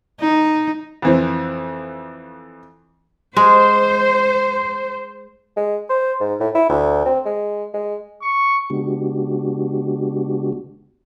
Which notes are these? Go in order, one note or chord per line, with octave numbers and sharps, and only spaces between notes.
D#4
F2 E3 C4
G#3 C5
G#3
C5
G#2
A2
E4
D2
C4
G#3
G#3
C#6
C#3 G#3 B3 D4 F#4 G4